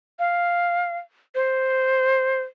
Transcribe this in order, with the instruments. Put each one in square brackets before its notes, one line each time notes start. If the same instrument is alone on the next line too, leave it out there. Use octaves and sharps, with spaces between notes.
[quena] F5
C5